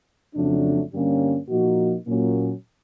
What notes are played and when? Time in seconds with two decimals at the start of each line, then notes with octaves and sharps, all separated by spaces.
0.34 F2 C#3 F#3 A3 D4
0.92 G2 D3 G3 A#3 C#4
1.49 A#2 F3 A#3 D#4 F#4
2.06 A#2 F#3 A#3 C#4